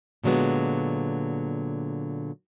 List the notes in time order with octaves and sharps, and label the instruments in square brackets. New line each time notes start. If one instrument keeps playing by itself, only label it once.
[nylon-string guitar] A#2 D3 F#3 G#3 B3